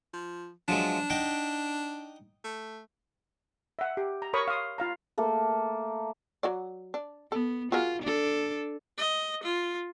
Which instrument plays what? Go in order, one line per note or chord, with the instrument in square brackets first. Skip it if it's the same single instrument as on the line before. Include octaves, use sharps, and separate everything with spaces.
[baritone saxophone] F3
[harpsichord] F3 F#3 G#3 [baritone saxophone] D4
[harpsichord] D#4 F#5 G5
[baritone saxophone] A3
[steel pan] E5 F#5
G4
A#5
A#4 C#5 B5 C#6 D#6
F5 C6 D#6
F4 F5 A#5
[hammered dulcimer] A3 A#3 A4
[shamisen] F#3 F#4 D5
D4
[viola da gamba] B3 [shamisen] A4
[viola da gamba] F4 [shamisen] F#4 G#4 A#4
[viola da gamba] D4 A4
[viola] D#5
F4